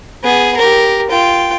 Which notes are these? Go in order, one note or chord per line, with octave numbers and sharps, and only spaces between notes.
B3 G#4
G4 A#4
F4 G5